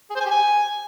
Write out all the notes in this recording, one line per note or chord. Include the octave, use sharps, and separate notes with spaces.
G#4
C5
G#5
G4
G#5